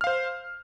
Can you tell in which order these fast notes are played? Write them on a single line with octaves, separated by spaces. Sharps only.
F6 F5 C5